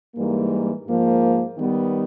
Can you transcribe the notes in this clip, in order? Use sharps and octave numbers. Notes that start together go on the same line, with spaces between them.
G#2 E3 G3 A#3
G#2 F3 A#3
D#3 G3 B3